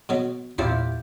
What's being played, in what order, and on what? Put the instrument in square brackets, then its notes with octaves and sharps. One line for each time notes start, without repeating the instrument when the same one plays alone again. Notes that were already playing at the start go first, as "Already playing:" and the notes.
[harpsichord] B2 F#3 B3
[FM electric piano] E2 A#2 [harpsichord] C4 D5 C#6 [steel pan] E4 F4 G4